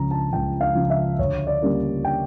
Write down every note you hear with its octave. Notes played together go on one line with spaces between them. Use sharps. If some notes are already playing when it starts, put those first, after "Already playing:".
Already playing: C#2 C#3 F3 A#5
A5
C#2 G5
F5
C#3 F3
E5
D2 C#5
D5
C#3 G3 A#3
G5